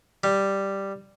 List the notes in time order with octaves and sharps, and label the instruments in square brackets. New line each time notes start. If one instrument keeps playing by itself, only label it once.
[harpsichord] G3